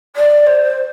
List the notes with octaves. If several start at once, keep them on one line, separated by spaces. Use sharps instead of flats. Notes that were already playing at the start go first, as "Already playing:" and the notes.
D5
C5
C5